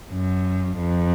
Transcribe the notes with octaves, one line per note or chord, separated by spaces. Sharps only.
F#2
F2